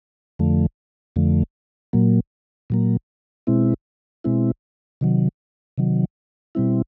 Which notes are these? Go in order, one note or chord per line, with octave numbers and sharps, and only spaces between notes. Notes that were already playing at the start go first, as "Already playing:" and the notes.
F2 D3 F3 A3
F2 D3 F3 A3
A#2 F#3 A#3
A#2 F#3 A#3
B2 G#3 C4 E4
B2 G#3 C4 E4
C3 D#3 F#3
C3 D#3 F#3
B2 G3 C4 E4